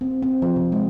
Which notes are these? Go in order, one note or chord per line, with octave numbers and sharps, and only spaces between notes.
C4
C4
F3
C3
G#3